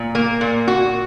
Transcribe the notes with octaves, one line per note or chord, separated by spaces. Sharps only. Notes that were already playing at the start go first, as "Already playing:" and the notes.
Already playing: A#2
A#3
A#2
F#4